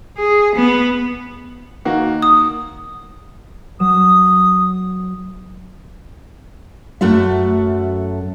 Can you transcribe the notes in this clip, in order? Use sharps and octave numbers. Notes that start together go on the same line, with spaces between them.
G#4
B3
D#3 A#3 F#4
D#6
F#3 D#6 E7
F#2 A3 F#4 A4 E5